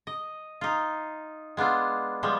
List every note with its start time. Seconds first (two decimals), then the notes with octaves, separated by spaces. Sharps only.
0.07 D#5
0.61 D#4 F4
1.57 G#3 B3 D4 F4
2.23 F3 G3 G#3